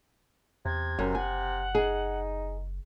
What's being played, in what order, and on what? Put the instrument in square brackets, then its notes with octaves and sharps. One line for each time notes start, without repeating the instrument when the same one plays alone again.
[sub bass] E2 [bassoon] C3 [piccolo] G#6
[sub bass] F#1 [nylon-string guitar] F#2
[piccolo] F#5 [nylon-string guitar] G#5
[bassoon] D#4 [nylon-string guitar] G#4